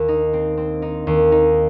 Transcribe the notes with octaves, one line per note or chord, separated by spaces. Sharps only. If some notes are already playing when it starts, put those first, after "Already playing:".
Already playing: D#2
D#4
C4
C4
D#4
D#2
D#4